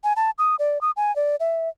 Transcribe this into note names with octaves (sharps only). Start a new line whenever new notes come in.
G#5
A5
D#6
D5
D#6
G#5
D5
E5